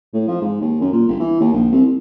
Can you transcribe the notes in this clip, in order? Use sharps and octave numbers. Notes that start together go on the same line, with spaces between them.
A2
F3
G#2
D#2
F#2
A#2
G1
E3
D#2
A#1
C2
C2